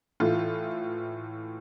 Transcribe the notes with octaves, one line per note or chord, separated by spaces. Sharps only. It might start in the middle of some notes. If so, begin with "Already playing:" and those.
A2 E3 F4